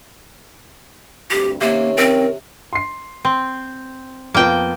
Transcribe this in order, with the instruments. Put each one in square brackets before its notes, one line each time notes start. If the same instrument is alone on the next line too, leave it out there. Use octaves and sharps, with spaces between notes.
[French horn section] D2 G2 C4 [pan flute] G4
[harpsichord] C3 [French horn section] D#3 C#4 C#5 [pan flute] A#3
[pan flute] C4 [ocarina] A#4
[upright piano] C6 C7
[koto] C4
[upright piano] F2 F3 B3 [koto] A#3 G5